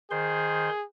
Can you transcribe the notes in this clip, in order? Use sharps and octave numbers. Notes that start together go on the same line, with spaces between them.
D#3 G#4 C5 C6